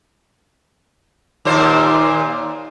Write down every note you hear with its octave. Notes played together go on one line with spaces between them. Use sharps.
D#2 A#2 C5